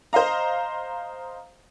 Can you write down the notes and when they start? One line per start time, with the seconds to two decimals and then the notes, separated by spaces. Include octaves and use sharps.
0.13 C5 D#5 F5 A#5